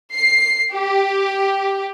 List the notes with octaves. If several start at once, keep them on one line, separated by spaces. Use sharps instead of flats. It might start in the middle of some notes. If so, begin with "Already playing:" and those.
C7
G4